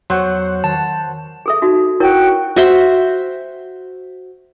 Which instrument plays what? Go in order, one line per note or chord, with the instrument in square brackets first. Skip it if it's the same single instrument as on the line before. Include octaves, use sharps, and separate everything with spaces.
[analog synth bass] E2 [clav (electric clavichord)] F#3 [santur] C5 C#5 F#5
[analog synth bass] D#3 [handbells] A5
[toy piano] G#4 A4 E5
D#4 F#4 E5
[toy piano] E4 A#4 C#5 [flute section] F#4 G5
[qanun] F#4 C5 E5 C6